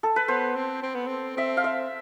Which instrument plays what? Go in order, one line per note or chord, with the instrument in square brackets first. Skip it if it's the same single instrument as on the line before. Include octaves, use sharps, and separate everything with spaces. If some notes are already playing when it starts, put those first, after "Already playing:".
[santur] A4
B4
[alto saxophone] B3 [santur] C5
[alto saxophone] C4
C4
B3
C4
[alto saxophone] C4 [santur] E5
[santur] F5
E5